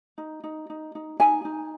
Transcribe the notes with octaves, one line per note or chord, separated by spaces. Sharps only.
D#4
D#4
D#4
D#4
D#4 G#5
D#4